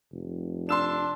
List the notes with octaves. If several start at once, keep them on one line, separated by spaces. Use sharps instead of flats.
F1
D4 C6 E6 E7